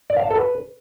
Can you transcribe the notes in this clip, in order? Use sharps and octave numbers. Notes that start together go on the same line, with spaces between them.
D5
F5
A5
A4
B4